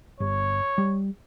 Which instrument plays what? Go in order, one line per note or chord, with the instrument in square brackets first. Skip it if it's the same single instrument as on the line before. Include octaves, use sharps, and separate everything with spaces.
[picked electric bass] G1 [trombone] C#5
[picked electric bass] G3